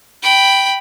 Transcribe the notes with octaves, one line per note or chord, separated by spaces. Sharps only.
G5 B5